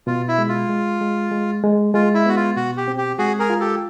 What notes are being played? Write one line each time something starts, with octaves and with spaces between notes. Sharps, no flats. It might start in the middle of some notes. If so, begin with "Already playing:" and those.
B2 F4
E4
G#3
F4
G#3
G#3
G#3
G#3
G#3 F4
E4
B3 F#4
F4
B2 F#4
G4
C4
G4
G#3 F#4 G#4
G#4 A#4
F4
G4 A4